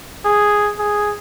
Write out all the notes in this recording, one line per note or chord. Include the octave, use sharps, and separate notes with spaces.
G#4
G#4